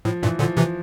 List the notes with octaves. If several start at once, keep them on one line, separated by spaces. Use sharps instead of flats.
A2 F3
G2 A#2 E3
A#2 D3 F3
C3 E3 F3